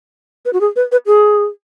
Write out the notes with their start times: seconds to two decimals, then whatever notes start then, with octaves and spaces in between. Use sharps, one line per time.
0.45 B4
0.53 F#4
0.61 G#4
0.76 B4
0.92 B4
1.07 G#4